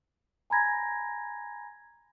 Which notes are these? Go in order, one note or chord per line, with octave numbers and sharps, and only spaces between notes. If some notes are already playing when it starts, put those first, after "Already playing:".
G#5 A#5 B5 G#6 A#6